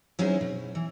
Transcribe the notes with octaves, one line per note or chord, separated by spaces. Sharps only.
F#3 C#4 D#4 E4 G#4 C5
B2
E3